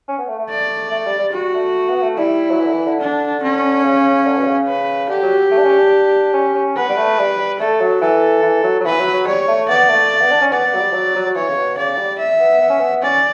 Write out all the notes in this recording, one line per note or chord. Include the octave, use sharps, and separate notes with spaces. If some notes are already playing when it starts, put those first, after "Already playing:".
C#4
B3
A3
A3
D5
A3
G3
G3
G3 F#4
A3
B3
A3
G3 E4
F#3
E3
D3
E3
D3
D4
C#4
C#3
D3
B2
C#3
B4
D3 G4
F#3
A3
D4
C#4
D4
C#4
C#4
B3 B4
G3
A3
G3
G3
A3 A4
F#3
E3 A4
E3
F#3
F#3
E3 B4
F#3
F#3
G3 C#5
A3
B3 D5
A3
A3
B3
D4
C#4
B3 D5
B3
F#3
G3
F#3
F#3
F#3
E3 C#5
C#3
B2
C#3 D5
G3
E5
B3
B3
C#4
B3
C#4 D5